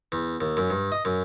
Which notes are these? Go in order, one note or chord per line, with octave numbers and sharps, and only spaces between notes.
E2
D#2
F#2
G2
D#5
F#2